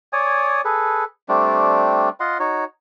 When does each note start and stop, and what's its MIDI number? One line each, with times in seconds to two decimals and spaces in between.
0.13 0.61 73
0.13 0.61 74
0.13 0.61 80
0.13 0.61 87
0.65 1.04 68
0.65 1.04 69
0.65 1.04 71
1.29 2.09 55
1.29 2.09 57
1.29 2.09 60
1.29 2.09 62
2.20 2.38 65
2.20 2.38 75
2.20 2.38 78
2.20 2.38 84
2.40 2.65 63
2.40 2.65 66
2.40 2.65 73